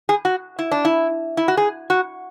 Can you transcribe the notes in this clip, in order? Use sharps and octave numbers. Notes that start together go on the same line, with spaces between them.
G#4
F#4
E4
D4
E4
E4
F#4
G#4
F#4